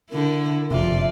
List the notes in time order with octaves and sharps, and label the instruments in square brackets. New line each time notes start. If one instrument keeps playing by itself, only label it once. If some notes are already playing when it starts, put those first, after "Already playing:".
[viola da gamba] D3 E4 [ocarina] A#4
[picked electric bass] F#1 C3 [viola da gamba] F2 F4 D5 [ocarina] E5